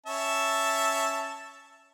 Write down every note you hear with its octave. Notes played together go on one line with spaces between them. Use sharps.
C#4 E5 A5